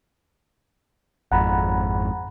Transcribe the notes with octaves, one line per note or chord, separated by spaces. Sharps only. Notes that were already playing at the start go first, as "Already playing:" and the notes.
G#1 F2 G#2 F#5 A#5 B5